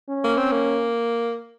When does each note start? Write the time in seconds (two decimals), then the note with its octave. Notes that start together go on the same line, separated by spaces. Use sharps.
0.09 C#4
0.24 A#3
0.37 C4
0.52 A#3